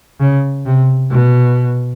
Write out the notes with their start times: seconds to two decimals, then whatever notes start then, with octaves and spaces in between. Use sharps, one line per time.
0.20 C#3
0.66 C3
1.11 B2